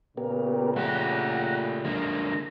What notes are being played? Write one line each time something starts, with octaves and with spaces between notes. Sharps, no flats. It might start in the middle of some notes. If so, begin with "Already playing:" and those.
A#2 C#3 B3 G4 A#4
A3 G4 F#5 A#5
D3 G#3 A#3 A#5